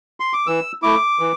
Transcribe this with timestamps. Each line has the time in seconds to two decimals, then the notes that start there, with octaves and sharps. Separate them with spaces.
0.20 C6
0.33 D6
0.47 E3 E6
0.83 A3 E4 D6
1.20 E3